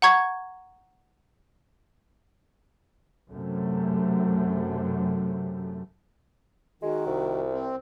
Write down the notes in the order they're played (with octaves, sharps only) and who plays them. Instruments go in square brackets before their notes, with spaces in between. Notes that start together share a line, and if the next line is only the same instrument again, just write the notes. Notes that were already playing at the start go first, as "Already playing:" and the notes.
[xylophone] F#5 A#5 C#6 G#6
[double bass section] F#2 C3 A3
[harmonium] D#3 [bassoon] G#3 [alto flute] F#4
[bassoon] C2
[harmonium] C4